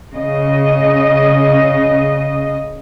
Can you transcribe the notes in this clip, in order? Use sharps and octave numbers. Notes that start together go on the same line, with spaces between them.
C#3 D#5